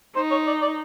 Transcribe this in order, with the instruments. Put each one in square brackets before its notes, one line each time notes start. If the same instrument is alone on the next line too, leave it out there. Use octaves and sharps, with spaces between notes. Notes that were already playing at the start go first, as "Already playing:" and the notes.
[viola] D#4 [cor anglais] C5
[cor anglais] C#5
D5
D5